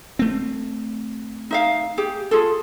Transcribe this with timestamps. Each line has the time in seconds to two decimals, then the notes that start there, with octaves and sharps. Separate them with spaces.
0.19 A3 C4
1.51 D#4 E5 F5
1.98 G4 G#4
2.31 F4 G#4 A4